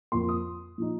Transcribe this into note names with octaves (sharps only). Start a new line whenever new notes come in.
F2 F3 A#3 C6
D#6
A#2 F3 D#4